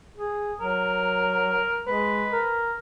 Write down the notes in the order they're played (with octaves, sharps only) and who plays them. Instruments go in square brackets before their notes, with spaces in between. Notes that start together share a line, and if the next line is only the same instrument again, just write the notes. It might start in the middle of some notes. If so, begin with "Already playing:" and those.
[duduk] G#4
[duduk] F#3 [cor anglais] A#4
[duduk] G#3 [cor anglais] B4
[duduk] A#4